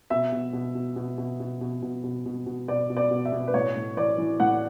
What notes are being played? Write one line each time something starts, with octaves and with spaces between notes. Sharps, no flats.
B2 E5
B2
B2
B2
B2
B2
B2
B2
B2
B2
B2
B2
B2 D5
B2
D5
B2
E5
B2
B4
A2 C#5
A2
E3 D5
E3
A2 F#5